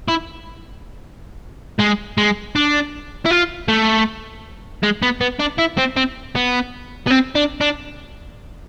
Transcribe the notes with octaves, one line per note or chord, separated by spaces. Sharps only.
E4
G#3
G#3
D4
E4
F4
A3
G#3
B3
B3
D4
E4
C4
C4
B3
B3
C4
D4
D4